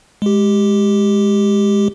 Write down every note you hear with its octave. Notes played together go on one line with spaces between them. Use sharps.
G#3 G4